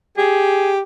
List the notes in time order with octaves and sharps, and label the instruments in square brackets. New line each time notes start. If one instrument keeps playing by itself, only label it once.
[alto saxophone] G4 [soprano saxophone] G#4